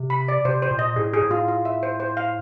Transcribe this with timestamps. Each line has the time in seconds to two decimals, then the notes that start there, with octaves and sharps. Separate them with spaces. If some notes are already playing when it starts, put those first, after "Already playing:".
Already playing: C3
0.10 B5
0.28 D5
0.45 C3 C5
0.62 C5
0.71 A#2
0.79 D#5
0.96 A2 G#4
1.14 G#4
1.23 A2
1.31 F4
1.48 F4
1.65 E5
1.83 C5
2.00 C5
2.17 F5